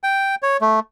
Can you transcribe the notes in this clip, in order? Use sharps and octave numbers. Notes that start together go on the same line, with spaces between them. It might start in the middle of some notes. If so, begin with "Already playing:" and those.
G5
C#5
A3